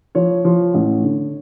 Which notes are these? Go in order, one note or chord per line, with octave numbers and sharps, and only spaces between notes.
F3 C#5
F3
A1
D3